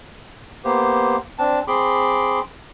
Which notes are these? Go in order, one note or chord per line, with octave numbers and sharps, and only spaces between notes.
A#3 B3 G4 C5
C4 D4 A5
C4 G#4 B5 C6 D6